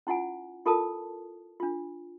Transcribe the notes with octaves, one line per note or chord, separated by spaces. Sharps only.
C#4 E4 F4 F#5 G#5
E4 F4 A4 A#4 A5 D#6
D4 F4